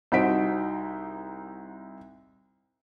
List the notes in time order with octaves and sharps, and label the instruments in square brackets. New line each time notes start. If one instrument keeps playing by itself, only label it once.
[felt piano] C2 D#4 F#4 C5 B6 D7